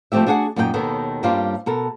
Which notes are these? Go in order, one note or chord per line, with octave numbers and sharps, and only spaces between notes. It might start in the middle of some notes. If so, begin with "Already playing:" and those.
F3 G3 A3 C4 G4 E5
D4 F#4 G#4 C5 F#5 G#5
F#2 A#2 D#4 A4 G5
D#2 B2 D#3 B3 A4 C#5
G2 G3 A#3 C4 C#4 F4
B2 A4 A#4